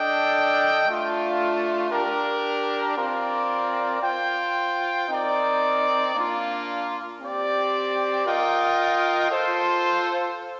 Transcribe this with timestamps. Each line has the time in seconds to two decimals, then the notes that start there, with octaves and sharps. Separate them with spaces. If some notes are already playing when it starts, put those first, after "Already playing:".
Already playing: D4 A4 D#5 G5
0.85 A3 D4 F4
1.90 D4 G4 A#4
2.96 C4 F4 A#4 D5
4.02 F4 C5 G5
5.07 C4 D#4 A#4 D5
6.14 A#3 D4 F4
7.19 C4 G4 D5
8.26 F4 A#4 D#5 G5
9.30 F4 A4 C5